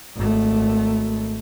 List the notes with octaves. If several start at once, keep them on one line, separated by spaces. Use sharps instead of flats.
G#1 A3